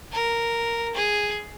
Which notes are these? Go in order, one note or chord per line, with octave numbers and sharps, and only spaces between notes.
A#4
G#4